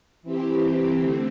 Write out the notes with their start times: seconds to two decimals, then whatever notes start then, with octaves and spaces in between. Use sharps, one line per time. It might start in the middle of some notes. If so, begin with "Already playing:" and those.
0.23 E3 C4 G4
0.99 D3 A3 C4